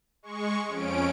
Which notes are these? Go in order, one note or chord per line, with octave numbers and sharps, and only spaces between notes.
G#3 C#6
F2 C#4 D7